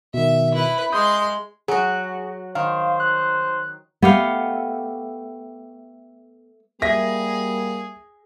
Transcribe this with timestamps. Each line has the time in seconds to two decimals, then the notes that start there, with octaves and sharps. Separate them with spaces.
0.14 B2 D#3 E5
0.52 E4 B4
0.92 G#3 C6 D#6 G6
1.68 F#3 F#4 G#4
2.55 D#3 C5 F5
3.00 F#6
4.02 A3 B3 G4 F5
6.82 G3 A#3 G#4 E5 A#6